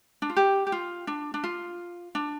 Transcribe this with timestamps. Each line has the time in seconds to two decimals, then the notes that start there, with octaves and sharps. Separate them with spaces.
0.22 D4
0.30 F4
0.36 G4
0.67 G4
0.72 F4
1.07 D4
1.34 D4
1.44 F4
2.15 D4